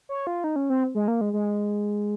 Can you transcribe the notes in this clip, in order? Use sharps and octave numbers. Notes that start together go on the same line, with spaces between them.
C#5
F4
D#4
C#4
C4
G#3
A#3
G#3
G#3